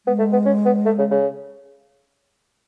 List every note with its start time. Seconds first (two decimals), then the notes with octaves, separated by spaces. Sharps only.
0.06 G#3 B3
0.19 A3
0.32 B3
0.46 C#4
0.65 B3
0.85 A3
0.99 C#3
1.11 C#3